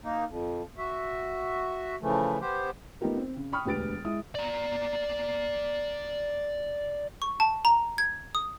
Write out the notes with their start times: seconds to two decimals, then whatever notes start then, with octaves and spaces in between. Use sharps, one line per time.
0.04 A#3 D#4
0.27 F2
0.78 F#4 E5
2.01 C#3 E3 F3 A3
2.41 B3 G4 C5
3.01 A3 B3 D#4 F4 G4 A#4
3.17 C4
3.36 C#3
3.52 G5 B5 C#6 D#6 F6
3.65 E1 D2 G4 B4 A6 D7
4.05 G#3 E4 G#4 D#6
4.35 D5 A#5
7.22 C#6
7.40 A5
7.65 A#5
7.98 G#6
8.35 D#6